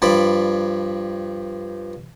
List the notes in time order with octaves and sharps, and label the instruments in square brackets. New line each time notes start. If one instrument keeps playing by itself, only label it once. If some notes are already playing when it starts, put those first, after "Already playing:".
[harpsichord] G2 F3 D5 B5